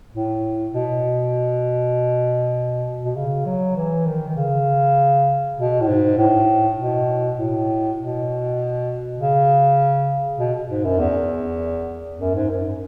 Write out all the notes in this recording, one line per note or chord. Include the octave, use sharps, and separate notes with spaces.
A2
B2
B2
C#3
F#3
E3
D#3
D#3
C#3
B2
A2
G#2
A2
B2
A2
B2
C#3
B2
G#2
F#2
E2
F#2
G#2
F#2